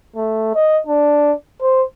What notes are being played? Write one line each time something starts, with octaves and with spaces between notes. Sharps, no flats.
A3
D#5
D4
C5